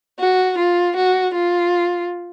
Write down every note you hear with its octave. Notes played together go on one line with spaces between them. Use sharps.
F#4
F4
F#4
F4